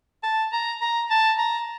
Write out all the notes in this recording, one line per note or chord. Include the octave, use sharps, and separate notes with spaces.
A5
A#5
A#5
A5
A#5